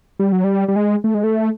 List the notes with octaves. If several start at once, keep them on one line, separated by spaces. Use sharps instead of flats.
G3
F#3
G3
G3
G#3
A3
G#3
A3